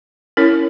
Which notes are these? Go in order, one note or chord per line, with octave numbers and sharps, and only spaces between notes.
C#4 E4 A#4 C#5